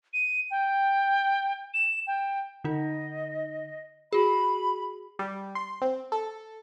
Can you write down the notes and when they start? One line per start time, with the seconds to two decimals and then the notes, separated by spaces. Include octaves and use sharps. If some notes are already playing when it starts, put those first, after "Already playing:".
0.13 D#7
0.51 G5
1.74 E7
2.07 G5
2.64 D3 D#4 D#5
4.13 F#4 G#4 B5
5.19 G3
5.55 C6
5.82 C4
6.12 A4